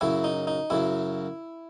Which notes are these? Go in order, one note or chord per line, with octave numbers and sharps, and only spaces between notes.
F#2 C#3 F#3 E4
D#4
D#4
F#2 C#3 F#3 E4